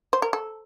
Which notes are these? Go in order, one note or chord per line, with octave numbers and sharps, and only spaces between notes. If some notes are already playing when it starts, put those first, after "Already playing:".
C5
A#4
A4